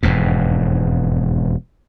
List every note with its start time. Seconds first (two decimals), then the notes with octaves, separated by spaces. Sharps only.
0.03 E1 F2 G#2